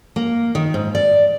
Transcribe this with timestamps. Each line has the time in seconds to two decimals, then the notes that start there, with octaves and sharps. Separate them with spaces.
0.16 A#3
0.55 D#3
0.74 G#2
0.95 D5